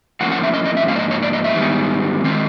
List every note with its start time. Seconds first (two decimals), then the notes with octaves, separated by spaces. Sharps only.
0.21 A2 F3 A#3 C#4 F4 F#5
0.32 F#5
0.43 E5
0.54 D#5
0.65 D#5
0.77 E5
0.88 G#2 F3 A#3 F5
0.96 D5
0.99 D#5
1.11 C#5
1.23 D5
1.33 D#5
1.44 E5
1.55 G#2 D#3 G3 B3
2.24 D#3 G#3 C4 F4